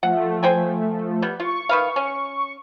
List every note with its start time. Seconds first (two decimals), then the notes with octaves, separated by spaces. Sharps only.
0.03 F3 A3 F#5
0.43 C5 G5 G#5
1.22 G3 B3
1.40 F4 C#6
1.69 D#3 B4 F5
1.96 C#4